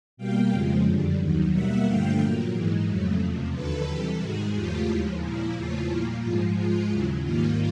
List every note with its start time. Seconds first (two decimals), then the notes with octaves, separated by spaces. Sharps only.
0.17 B2 G3 A#3 F5 G5
0.50 F2 C#3 F3 G#3
0.85 F#2 D3 G3
1.18 D#2 D#3 F#3
1.52 B2 G3 A#3 E5 F#5
1.85 G2 D3 F3 A3 F5 G5
2.19 A#2 F#3 A#3
2.52 G#2 E3 G#3
2.87 F2 C#3 F#3 A3
3.20 E2 C3 F3
3.53 D#2 D3 F#3 A4 B4
3.87 C3 E3 G3 G4 A4
4.20 G#2 D#3 G#3 F#4 G#4
4.54 E2 C#3 F3 A3 F4 G4
4.87 D#2 C#3 F3 G#3 E4
5.22 A#2 F3 A#3 E4
5.56 E2 C#3 F3 A3 F4
5.88 A#2 G3 A#3 E4
6.22 G#2 F3 G#3 F4
6.56 G#2 F3 G#3 F4
6.89 D#2 C#3 F#3 E4
7.23 G#2 D#3 G3 A#3 F4